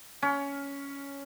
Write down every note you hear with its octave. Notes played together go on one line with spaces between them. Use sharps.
C#4